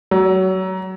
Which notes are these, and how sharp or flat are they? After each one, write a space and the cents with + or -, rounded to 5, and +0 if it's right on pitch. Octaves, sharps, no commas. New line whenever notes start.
F#3 +25